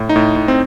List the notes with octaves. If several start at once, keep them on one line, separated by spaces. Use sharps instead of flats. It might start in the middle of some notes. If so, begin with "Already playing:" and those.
Already playing: A2
D#4
A2
A2
C4